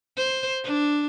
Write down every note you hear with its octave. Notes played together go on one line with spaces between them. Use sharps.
C5
D4